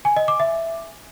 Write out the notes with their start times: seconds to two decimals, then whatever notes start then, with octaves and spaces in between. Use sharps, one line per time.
0.05 G#5
0.17 D#5
0.28 D6
0.40 E5